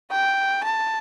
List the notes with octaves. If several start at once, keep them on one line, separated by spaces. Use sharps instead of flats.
G5
A5